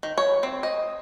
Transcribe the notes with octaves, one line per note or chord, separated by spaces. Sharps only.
D#3
C#5
C4
D#5